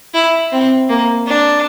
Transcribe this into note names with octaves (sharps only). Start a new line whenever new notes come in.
E4
C4
A#3
D4